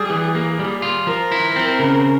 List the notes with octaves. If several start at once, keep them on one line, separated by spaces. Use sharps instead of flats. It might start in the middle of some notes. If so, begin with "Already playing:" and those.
Already playing: G3 G#4
E3
A#3
G3
F4
F3 A#4
E4
C4
C#3